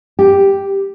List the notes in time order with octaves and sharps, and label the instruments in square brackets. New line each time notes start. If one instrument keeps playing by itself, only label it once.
[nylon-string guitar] G4